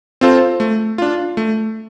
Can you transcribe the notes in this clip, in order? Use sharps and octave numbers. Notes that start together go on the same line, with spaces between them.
C4 F4 A4 C5
A3
D4 F4
A3